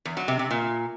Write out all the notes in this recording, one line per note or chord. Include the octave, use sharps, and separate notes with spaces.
E2
F#3
C3
C3
A#2